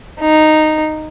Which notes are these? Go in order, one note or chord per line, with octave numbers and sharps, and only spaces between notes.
D#4